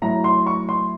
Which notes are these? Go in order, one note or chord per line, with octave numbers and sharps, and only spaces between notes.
A2 F#3 A#5
C6
C#6
C6